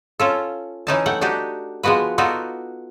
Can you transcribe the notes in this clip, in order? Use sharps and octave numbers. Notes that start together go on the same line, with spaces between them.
C#4 F4 A4
E3 C#4 D#4 A5
A3 F#5 G5
D4 D#4 F#4 G4
F3 G#3 B3 F#4 B4
B3 D#4 F4 F#4 A4 D5